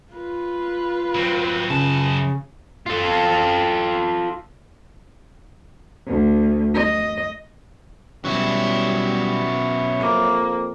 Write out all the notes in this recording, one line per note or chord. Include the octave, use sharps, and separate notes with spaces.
F4 B4
F#3 C4
F#2 C#3 A5
F4 A4
D2
D#5
B2 F#3 G3 C#4 E4 C#6
F2 A#3